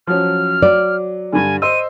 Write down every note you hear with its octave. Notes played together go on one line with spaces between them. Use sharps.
F3 F#3 C#4 F6
F#3 D5
G2 D3 G#5
C5 D#5 E6 D#7